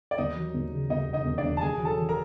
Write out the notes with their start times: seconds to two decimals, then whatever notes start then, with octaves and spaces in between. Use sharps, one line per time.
0.11 D5
0.18 D#2 D#4 D#5
0.36 F#3
0.54 D#2
0.72 C#3
0.90 D#2 D#4 D#5
1.08 E1
1.13 D#4 D#5
1.25 D#2
1.38 D4 D5
1.43 D#2
1.57 A5
1.61 D#2 G#4 G#5
1.79 F#3
1.85 A4 A5
1.98 F#3
2.09 A#4 A#5